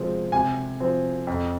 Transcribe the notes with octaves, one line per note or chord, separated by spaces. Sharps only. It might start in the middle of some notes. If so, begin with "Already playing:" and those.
Already playing: C3 F3 G#3 C4
C3 G#5
F3 C4
F2